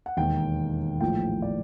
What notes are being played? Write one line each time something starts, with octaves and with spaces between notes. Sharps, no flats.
F#5
E1 D#2 D#3 G5
A#1 A2 F3 G5
D5